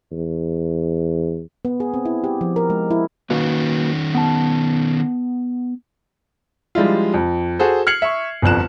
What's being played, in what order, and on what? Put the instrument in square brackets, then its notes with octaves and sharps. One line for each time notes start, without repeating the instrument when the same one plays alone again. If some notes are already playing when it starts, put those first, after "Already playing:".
[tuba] E2
[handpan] B3
G#4
C4
E4
G4
F3
A#4
G#3
E4
[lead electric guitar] D#3 C#4 [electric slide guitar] A#3 F#4 B4
[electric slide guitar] B3 A5
[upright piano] F3 G3 G#3 D4 E4 F4
F2
F#4 G#4 A4 C5
F6 G#6 C7 C#7 F#7
E5 C#6
G1 C2 F2 F#6 E7